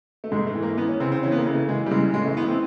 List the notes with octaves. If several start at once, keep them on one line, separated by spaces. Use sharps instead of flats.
A3
G#2 G#3
A3
E3
A#3
E3 B3
C#4
C#3 C4
C4
E3 C#4
B3
A#3
C#3
A3
E3 G#3
G3
C#3 G#3
A2 G#3
A3
E3 B3
C4